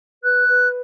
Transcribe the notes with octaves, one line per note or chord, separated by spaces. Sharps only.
B4 F#6
B4